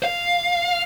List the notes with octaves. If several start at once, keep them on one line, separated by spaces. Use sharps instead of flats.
F5